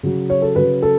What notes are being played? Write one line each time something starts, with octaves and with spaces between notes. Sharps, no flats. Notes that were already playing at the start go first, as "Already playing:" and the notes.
C#3 F#3
C#5
A4
C#3 F#3 B4
A4